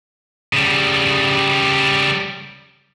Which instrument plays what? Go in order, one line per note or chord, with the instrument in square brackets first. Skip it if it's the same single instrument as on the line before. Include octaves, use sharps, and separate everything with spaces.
[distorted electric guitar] C#3 G3